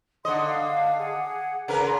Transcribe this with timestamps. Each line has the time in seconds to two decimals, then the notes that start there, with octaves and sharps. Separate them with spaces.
0.25 D3 D#5 F#5 C6
0.46 F5
0.98 G#4 F#5
1.68 C#3 A#4 B4
1.85 C6